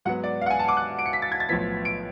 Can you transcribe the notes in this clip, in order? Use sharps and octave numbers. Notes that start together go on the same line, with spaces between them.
G#2 F#3 B3 F#5
D5
F5
F#5
G#5
A5
D6
F#6
D7
C#7
B6
A6
G#6
A6
B1 A2 F3 B3 B6
D7